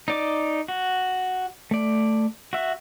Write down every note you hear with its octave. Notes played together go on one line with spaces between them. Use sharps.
D#4 D5 D6
F#4
A3 D5
F#4 E5